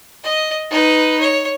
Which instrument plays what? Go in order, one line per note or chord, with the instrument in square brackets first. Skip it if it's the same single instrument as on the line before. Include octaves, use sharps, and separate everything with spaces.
[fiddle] D#5
D#4 B4
C#5